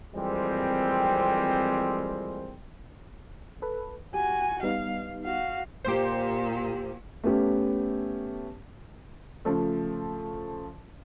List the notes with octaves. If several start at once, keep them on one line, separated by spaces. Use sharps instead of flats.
F2 E3 G3 G#3 A#3 C4
A4 B4
F#4 G4 G#5
G3 B3 D#4 F5
F#4 F5
A#2 G4 C5
A3 B3 C#4 G4
C#3 F3 A3